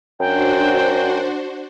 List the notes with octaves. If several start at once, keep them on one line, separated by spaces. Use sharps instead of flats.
F#2 D4 F#4 C5 G5